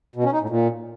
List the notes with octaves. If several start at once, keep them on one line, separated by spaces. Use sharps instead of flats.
B2
C#4
D#4
A2
A#2